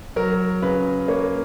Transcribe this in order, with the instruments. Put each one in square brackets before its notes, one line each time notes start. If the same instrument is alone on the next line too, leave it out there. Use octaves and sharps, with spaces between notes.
[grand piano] F#3 A#4
C#3 B4
A#3 C#5